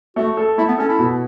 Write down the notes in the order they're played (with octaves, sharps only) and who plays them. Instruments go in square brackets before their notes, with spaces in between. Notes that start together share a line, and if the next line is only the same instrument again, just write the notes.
[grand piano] A3 [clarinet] F#4
[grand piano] A4
[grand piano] A3 [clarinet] E4
[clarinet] B3
[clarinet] C#4 [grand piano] A4
[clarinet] E4
[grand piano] B2